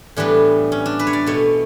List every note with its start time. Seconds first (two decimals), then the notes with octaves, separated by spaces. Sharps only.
0.17 A2 E3 G3 B3 D4
0.72 C#4
0.86 D4
0.99 B4
1.07 C#5
1.13 D5
1.26 B2 A3 C#5